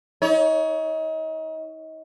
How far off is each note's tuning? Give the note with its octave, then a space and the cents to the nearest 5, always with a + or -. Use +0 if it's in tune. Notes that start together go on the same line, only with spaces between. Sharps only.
D#4 +35 C#5 +20